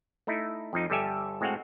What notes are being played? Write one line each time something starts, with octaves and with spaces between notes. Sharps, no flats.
A3 D#4 E4
F2 F3 D#4
G1 G3 G4 A4 E5 G#5
A2 G#3 C4 F#4 F5 F#5